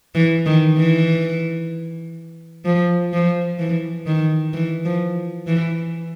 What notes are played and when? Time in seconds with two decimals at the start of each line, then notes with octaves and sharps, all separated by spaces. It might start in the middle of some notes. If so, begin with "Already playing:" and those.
0.15 E3
0.46 D#3
0.78 E3
2.65 F3
3.13 F3
3.59 E3
4.06 D#3
4.53 E3
4.85 F3
5.47 E3